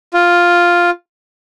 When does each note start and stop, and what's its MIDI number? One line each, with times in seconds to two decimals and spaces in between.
0.14 0.90 65